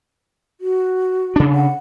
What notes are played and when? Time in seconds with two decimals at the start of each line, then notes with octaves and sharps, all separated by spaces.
0.61 F#4
1.36 C#3 D4
1.54 F#5